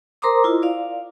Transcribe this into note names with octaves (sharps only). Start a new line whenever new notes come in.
A#4 C5 A#5 C6 D6 D#6
E4 F4 D#5
D5 F5